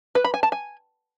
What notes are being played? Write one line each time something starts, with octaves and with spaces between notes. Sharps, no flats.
B4
B5
G#5
A5
G#5